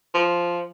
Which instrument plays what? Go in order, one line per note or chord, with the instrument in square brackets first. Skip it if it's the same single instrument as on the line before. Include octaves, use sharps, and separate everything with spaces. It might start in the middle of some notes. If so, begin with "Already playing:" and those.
[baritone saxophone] F3